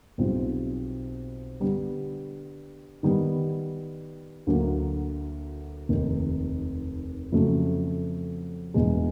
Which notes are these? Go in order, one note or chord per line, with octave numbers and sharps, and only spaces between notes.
B1 B2 G3 C4 F4
D3 G3 B3
D#3 G3 B3
D2 D3 F#3 A#3
F1 D#2 D#3
F2 C#3 F#3 A3
E1 E2 B2 G#3